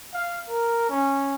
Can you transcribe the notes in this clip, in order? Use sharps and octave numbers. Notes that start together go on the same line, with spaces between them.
F5
A#4
C#4